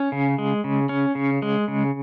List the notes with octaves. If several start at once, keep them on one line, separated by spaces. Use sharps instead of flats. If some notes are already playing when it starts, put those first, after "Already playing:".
Already playing: C#4
C#3
G#3
C#3
C#4
C#3
G#3
C#3